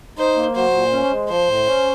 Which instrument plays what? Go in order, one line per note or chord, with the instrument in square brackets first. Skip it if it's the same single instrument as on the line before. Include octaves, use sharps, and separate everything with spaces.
[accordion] D#4 [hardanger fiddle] C5
[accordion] A#3
[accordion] F#3 [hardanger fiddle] C5
[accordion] A#2
C#4
G#3
[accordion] F3 [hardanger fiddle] C5
[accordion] A2
C#4